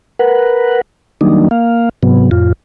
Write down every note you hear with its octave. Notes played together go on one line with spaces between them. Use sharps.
A#4 B4 F#5
D#3 F#3 G3 A#3 D4 D#4
A#3 F5
G#2 C3 F#3 B3
F2 A2 F4